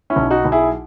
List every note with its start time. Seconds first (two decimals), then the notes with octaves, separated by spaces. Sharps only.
0.10 C#4 E4
0.16 B1
0.31 D#4 F#4
0.45 B1
0.52 E4 G#4